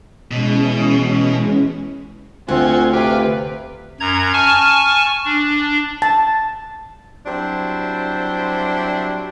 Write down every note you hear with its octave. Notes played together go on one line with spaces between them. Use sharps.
B2 E3 G#3 C#4
D2 C4 F4 F#4 G#5
C3 F4 B4 D5
F#2 A#5 G#6
G#5 A5 C#6 F6
D4
A5
F#3 G3 C4 D4 E4 C5